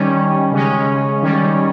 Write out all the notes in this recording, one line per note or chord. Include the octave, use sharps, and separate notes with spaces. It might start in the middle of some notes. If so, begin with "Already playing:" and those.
Already playing: D#3 G3 C#4
C#3 G#3 C#4
D#3 G3 C#4